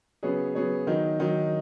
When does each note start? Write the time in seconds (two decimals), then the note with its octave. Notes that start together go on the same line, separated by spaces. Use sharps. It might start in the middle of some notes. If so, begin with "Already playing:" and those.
0.23 C#3 F#3 B3 G#4 C#5
0.55 C#3 F#3 B3 G#4 C#5
0.87 D#3 F#3 D#4
1.19 D#3 F#3 D#4